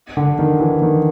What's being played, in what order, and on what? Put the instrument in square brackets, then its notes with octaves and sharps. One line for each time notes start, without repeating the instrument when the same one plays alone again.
[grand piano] D3
D#3
E3
D#3